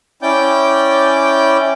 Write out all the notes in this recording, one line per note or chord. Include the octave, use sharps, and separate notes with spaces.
C#4 E4 D5 G5 D6 G6